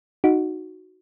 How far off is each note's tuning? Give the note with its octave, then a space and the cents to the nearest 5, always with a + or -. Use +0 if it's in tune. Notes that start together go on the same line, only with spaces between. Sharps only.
D#4 +0 F#4 +0